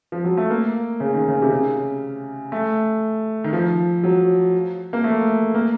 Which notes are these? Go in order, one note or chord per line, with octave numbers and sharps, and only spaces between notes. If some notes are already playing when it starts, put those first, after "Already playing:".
F3
F#3
A3
A#3
C#3
D#3
C#3
C3
C#3
A3
D#3
F3
F#3
A#3
A3
A#3